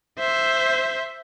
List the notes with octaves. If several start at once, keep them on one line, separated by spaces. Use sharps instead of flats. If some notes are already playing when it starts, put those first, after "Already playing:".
C5 E5